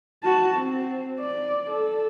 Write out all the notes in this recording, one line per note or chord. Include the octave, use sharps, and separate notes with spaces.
F#4 A5
C4
D5
A4